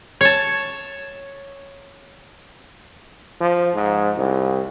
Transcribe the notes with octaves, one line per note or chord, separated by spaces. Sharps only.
C#5 A5
F3
G#2
C2